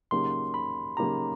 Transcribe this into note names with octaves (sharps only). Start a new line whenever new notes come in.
C#3 F#3 A#3 D#4 G4 C6
B5
C#3 F#3 A#3 D#4 G4 A#5